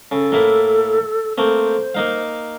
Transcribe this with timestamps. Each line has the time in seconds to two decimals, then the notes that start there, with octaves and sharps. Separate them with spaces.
0.11 C#3 A4
0.32 A2 A#3 E4
1.38 A3 A#3 C4 C5
1.95 A#3 D#4 F5